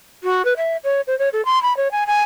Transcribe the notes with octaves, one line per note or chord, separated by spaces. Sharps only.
F#4
B4
E5
C#5
C5
C#5
A4
C6
B5
C#5
G#5
G#5